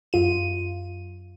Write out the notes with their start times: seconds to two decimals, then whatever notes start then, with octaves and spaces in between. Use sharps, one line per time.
0.13 F#2 F4 D#7